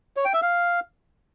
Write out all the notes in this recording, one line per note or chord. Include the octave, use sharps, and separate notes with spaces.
C#5
G5
E5
F5